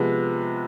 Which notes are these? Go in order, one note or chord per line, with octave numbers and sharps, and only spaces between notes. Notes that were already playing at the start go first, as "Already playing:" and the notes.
Already playing: C3 F3 G#3 B3